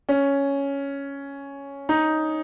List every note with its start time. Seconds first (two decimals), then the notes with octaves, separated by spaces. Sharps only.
0.09 C#4
1.89 D#4